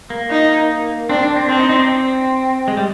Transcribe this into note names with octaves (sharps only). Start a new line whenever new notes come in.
A#3
D#4
C4 D4
D4
C4
C4 D4
D#4
D#4
D4
C4
G#3
G3